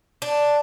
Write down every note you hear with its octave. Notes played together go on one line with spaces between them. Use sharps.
D4